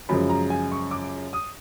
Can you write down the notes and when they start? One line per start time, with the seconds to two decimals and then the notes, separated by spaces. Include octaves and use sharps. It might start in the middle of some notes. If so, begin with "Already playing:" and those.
0.09 F#2 C#3 F3 G#3 B5
0.29 A#5
0.50 G#5
0.72 C#6
0.91 D6
1.33 D#6